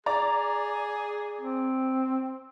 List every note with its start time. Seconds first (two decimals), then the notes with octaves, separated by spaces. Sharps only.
0.06 G#4 D5 A#5
1.41 C4